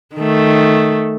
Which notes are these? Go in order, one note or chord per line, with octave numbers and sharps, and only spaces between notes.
D#3 A3